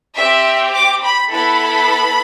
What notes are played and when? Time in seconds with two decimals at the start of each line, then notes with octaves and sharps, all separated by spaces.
0.16 C4 G4 E5
0.74 D6
1.03 B5
1.32 B3 E4 A4 B5